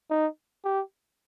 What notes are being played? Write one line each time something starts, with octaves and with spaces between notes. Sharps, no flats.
D#4
G4